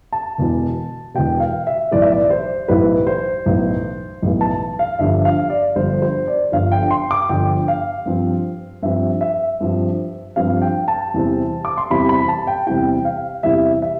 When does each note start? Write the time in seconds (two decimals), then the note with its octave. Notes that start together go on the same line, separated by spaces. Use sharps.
0.12 A5
0.38 E1 E2 B2
1.14 E1 E2 B2 G5
1.40 F5
1.67 E5
1.91 B1 A2 E3 B3 D5
2.02 E5
2.12 D5
2.30 C5
2.68 B1 A2 E3 B3 B4
3.07 C5
3.46 B1 A2 E3 B3
4.22 B1 A2 E3 B3
4.41 A5
4.79 F5
4.99 G1 G2 D3 F3 E5
5.25 F5
5.50 D5
5.76 G1 G2 D3 F3 C5
6.02 C5
6.28 D5
6.52 G1 G2 D3 F3 F5
6.72 G5
6.91 C6
7.11 D6
7.29 G1 G2 D3 F3 G5
7.68 F5
8.06 G2 F3 C4
8.82 G2 F3 C4 E5
9.21 E5
9.60 G2 F3 C4
10.36 G2 F3 C4 F5
10.62 G5
10.88 A5
11.14 E2 C3 G3 C4 E4
11.65 D6
11.78 C6
11.90 E2 C3 G3 C4 E4 B5
12.09 B5
12.28 A5
12.47 G5
12.67 E2 C3 G3 C4 E4 G5
13.05 F5
13.43 E2 C3 G3 C4 E4 E5
13.82 E5